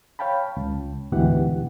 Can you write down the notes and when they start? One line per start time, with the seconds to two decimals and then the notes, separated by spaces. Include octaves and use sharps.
0.19 C#5 F5 G5 A5 B5
0.57 C#2
1.12 D2 G#2 B2 E3 G4 F#5